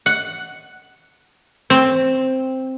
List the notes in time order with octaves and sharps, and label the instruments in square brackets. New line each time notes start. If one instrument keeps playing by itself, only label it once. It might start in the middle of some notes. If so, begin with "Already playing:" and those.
[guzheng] F#5
C4